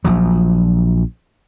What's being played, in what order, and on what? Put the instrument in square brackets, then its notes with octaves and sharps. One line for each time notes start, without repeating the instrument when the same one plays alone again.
[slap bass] A#1 F3 F#3